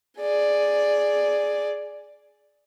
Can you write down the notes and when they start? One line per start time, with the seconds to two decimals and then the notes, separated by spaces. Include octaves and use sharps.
0.20 G#4 D5